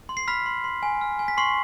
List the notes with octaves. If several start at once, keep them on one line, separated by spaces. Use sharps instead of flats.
C6
C7
B5 F6 B6
C6
C6
G#5
F6
G#5
B6
C6 C#6 C7